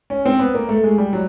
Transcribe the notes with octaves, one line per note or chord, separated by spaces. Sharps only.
C#4
C4
B3
A#3
A3
G#3
G3
F#3